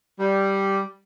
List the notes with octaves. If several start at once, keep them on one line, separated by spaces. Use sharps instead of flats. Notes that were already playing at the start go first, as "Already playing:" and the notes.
G3